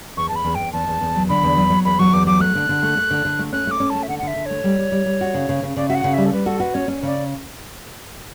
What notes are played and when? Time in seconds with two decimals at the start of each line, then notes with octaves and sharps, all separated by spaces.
0.17 E2 C#6
0.29 A5
0.32 E2
0.36 B5
0.45 E2
0.55 E2 G5
0.73 E2 A5
0.88 E2
1.01 E2
1.16 F#3
1.29 D3 B5
1.43 E2
1.56 F#3
1.70 F#3
1.85 E2 B5
1.99 F#3 C#6
2.13 E2 D6
2.27 F#3 D6
2.40 A3 F#6
2.55 D3
2.69 D3
2.83 A3
2.97 A3
3.11 D3
3.25 D3
3.39 A3
3.53 C#4 F#6
3.67 A3 D6
3.80 C#4
3.90 A3 A5
4.03 E5
4.08 D3 F#5
4.19 F#5
4.23 D3
4.27 E5
4.36 D3
4.46 A3 C#5
4.64 G3
4.78 G3
4.92 G3
5.06 G3
5.21 F#4
5.34 C#3
5.49 C#3
5.63 C#3
5.76 C#3 D5
5.88 F#4 E5
5.95 F#5
6.04 C#3
6.13 G3 E5
6.26 A4
6.32 G3 B4
6.46 F#4 A4
6.60 F#4 B4
6.74 C#4 C#5
6.88 C#4
7.03 C#3 D5